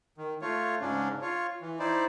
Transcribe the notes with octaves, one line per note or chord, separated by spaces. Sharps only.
D#3
A3 F4 C#5
G#2 C#3 C#4 D4
F4 C#5
E3
D#4 E4 C5 D5